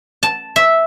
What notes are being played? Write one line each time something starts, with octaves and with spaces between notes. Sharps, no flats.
A5
E5